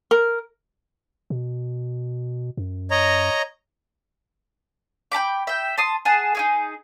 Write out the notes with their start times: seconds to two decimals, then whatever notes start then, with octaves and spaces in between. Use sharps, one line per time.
0.11 A#4
1.30 B2
2.57 F#2
2.91 C#5 D#5 A#5
5.12 G5 A5 B5 D6
5.47 E5 G5
5.78 A5 C6 D#6
6.05 G#4 F#5 A5
6.35 D#4 E4 G#4